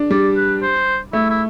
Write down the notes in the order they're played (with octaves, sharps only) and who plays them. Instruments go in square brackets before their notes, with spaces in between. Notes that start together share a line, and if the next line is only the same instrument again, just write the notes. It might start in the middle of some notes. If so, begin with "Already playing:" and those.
Already playing: [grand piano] D4
[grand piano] G3 [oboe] D5
[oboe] B4
C5
[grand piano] A3 [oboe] E4
[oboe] E4